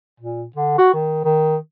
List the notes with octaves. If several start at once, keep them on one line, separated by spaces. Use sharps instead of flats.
A#2
D3
F#4
D#3
D#3